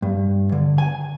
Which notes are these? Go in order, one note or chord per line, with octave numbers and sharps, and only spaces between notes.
G2
D3
G#5